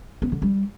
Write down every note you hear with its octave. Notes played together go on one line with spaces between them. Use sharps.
B3
D3
G3